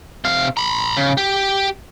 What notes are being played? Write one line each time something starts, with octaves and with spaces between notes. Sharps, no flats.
C3 F5
A#5 B5
C#3
G4